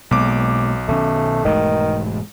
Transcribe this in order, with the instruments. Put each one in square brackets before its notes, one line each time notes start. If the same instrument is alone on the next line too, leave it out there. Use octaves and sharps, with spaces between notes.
[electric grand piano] B1 D6 [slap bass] B2 G#3 A#3
[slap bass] B2 D#3 C#4 [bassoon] A3
[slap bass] E1 G#2 A3 [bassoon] D#3